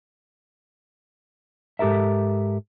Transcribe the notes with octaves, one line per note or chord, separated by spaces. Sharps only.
G#2 G4 A4 A#4 E5